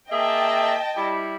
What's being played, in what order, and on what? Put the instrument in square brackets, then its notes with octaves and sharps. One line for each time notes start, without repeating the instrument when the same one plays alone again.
[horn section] A#3 G#4 E5 [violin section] D#5 G5 A5
[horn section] G3 E4